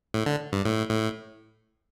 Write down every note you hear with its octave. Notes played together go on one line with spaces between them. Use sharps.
A2
D3
G2
A2
A2